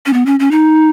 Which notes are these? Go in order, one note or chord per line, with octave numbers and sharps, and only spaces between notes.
C#4
B3
C#4
C#4
D#4